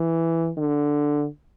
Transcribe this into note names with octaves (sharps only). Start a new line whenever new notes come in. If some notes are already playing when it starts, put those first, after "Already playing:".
Already playing: E3
D3